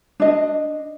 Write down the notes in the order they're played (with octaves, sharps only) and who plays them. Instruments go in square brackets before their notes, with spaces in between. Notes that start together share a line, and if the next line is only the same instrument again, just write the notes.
[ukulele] D4 D#5